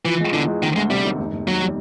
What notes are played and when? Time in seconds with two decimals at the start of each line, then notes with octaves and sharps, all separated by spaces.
0.05 E3 F3
0.20 G#3
0.33 E2 D3
0.47 G#3
0.62 D2 D#3
0.76 D2 G#3
0.90 C3 G3
1.05 D#3
1.19 F1
1.32 F1
1.47 D#2 F#3
1.61 G3